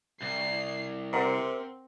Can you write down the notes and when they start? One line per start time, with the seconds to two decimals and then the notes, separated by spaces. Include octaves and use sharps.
0.22 C2 C7
1.13 C3 C4 A#4 F#5 A#5